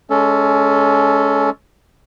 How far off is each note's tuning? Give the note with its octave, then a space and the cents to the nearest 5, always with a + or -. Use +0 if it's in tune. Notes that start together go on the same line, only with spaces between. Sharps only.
G#3 +25 C#4 +20 A4 +0